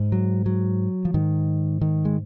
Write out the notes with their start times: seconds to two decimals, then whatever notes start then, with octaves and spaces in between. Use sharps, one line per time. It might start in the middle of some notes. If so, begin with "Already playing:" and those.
Already playing: G#2
0.12 F#3
0.46 F#3
1.05 F3
1.14 G#2 D#3
1.81 D#3
2.05 G#3